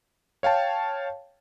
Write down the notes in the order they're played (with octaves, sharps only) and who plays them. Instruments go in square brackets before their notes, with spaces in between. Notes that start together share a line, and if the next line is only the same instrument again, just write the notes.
[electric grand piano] C#5 F5 G5 A5